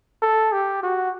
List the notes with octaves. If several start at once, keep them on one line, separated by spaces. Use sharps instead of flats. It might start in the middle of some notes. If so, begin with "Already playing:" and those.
A4
G4
F#4